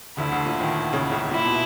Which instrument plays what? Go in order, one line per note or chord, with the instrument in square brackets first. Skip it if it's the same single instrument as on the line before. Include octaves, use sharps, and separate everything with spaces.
[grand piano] D2 D3 [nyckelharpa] E4
[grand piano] D2 D3
A#2
D#2 D#3
C#2 C#3
C#2 C#3
[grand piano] A#2 [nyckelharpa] E4
[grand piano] B2